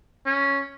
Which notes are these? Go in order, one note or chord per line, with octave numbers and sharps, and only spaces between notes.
C#4